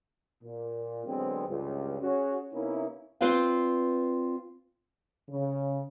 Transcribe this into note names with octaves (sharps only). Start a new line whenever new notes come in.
A#2
D3 F#3 G#3 B3 C4
C#2 G2
C#4 F#4 G#4 C#5
C3 A#3 B3 C#4 D#4 E4
C4 F4 B4 D5 F5
C#3